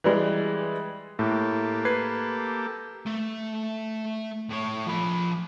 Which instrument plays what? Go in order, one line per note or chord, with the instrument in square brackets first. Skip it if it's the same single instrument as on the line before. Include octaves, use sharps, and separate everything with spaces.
[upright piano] E3 G3 G#3
[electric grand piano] A2 [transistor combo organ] A#3 G4 A4
[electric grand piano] B4 G#6 C7
[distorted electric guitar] A3
A2 C#5
F3 B5